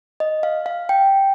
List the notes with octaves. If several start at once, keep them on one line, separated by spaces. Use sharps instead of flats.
D#5
F5
F5
G5